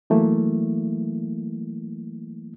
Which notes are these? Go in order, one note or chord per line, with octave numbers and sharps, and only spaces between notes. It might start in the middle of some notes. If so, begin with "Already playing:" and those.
E3 F#3 A3 A#3 E4